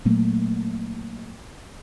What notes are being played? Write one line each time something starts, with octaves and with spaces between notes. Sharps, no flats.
A#2 F#3 A3 A#3